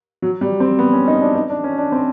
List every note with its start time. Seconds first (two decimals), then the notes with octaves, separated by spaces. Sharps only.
0.22 F#3
0.41 G3
0.60 C4
0.79 B3
0.93 C#4
1.08 D#4
1.22 D4
1.36 D#4
1.50 D4
1.64 C#4
1.78 D4
1.92 C4